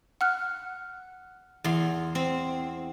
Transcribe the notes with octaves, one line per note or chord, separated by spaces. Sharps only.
F#5 F6 F#6
E2 C6
C4